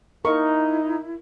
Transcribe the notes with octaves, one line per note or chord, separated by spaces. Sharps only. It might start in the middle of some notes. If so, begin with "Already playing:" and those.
D#4 E4 A#4 C#6